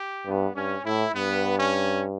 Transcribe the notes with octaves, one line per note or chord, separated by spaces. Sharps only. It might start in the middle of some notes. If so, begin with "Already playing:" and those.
Already playing: G4
G2 B3
G2 C#4
A2 E4
G2 B3
C#4